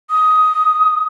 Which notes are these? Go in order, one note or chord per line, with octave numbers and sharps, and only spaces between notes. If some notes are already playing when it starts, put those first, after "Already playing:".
D#6